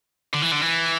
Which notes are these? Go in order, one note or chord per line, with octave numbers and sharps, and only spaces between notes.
D3
E3
D3
E3